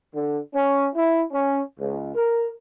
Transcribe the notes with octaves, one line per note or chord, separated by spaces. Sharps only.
D3
C#4
E4
C#4
C#2
A#4